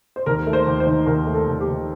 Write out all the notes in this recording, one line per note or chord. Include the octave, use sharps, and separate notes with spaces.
C5
D#2 A#4
A3
C5
D#2
C5
D#3
D#2 A#4
A3
A4
D#2
G4
D#3